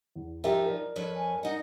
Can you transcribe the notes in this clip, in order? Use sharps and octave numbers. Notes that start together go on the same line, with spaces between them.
E2
F3 D#4 G4 A#4 E5
A#4 D5
F2 B4 C#5
G#5
D#4 D#5 F#5